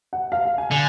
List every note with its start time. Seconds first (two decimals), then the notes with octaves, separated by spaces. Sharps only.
0.13 F#5
0.32 F5
0.45 F5
0.58 G#5
0.71 D3